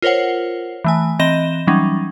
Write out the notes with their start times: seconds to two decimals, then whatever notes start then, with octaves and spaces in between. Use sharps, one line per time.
0.02 F4 A#4 C5 C#5 F#5
0.84 E3 A3 G#5
1.19 E3 C4 D#5 A#6 E7 G7
1.67 E3 F#3 G3 C#4 D#4